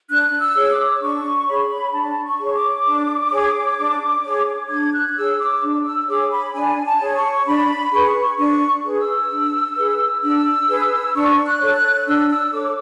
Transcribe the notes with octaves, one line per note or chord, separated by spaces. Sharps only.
D4 F#6
E6
G#4 C#5
D6
D4 C#6
G#4 C#5 B5
D4 A5
C#6
G#4 C#5
D6
D4
G#4 C#5
D4
G#4 C#5
D4 G#6
F#6
G#4 C#5 E6
D6
D4
E6
G#4 C#5 D6
B5
D4 G#5
A5
G#4 C#5
C#6
D4 B5
G#4 B4 C#6
D4 C#6
G#4 B4
E6
D4
G#4 B4
D4 E6
G#4 B4
D4 C#6
F#6
A4 C#5
F#6
D4 E6
E6
A4 C#5 D6